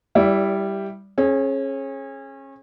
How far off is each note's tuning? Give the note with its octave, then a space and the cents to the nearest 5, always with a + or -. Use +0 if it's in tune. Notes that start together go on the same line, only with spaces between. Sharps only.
G3 +0 E4 +0 D5 -25
C#4 -30 G#4 +25